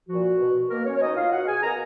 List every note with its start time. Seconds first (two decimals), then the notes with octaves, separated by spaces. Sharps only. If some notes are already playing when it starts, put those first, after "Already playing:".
0.09 A#2 F3 F#4
0.39 B2
0.70 B2 A#3 A#4
0.86 C#4 C#5
0.97 C#5
1.01 B2 D#4 D#5
1.16 F4 F5
1.32 B2 F#4 F#5
1.47 G#4 G#5
1.63 B2 A#4 A#5